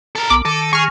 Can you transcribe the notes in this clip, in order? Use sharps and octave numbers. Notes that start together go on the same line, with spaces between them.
A4 A#4
B1 B3 D6
D#3 A4
G#4 C#6 F6